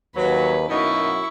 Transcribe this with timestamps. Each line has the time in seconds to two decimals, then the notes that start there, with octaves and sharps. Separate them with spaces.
0.16 D#2 F#3 B4
0.69 F#2 B2 A#3 D#4 E4 C#6